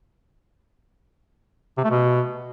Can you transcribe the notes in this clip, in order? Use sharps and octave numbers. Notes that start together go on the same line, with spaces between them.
C3
A3
B2